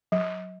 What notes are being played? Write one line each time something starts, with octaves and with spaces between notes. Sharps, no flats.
F#3